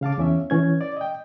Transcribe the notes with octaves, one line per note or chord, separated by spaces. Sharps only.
C#3 F5 A5 D6
E2 C#4 E5
E3 C#4 G#6
D5
D#5 G5